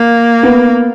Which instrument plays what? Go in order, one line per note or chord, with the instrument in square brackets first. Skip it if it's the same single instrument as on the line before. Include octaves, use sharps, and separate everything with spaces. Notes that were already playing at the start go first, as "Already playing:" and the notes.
Already playing: [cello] A#3
[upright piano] B3